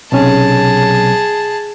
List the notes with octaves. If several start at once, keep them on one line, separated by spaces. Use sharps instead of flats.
B1 C3 C#4 G#4 A5